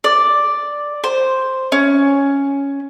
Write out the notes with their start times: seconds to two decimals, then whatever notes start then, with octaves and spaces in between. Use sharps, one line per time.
0.04 D5
1.04 C5
1.72 C#4